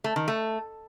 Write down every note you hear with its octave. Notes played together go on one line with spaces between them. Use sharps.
A3
D#3
A3